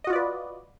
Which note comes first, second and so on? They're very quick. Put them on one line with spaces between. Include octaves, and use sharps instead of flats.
D#5 F#4 F4 D5 B4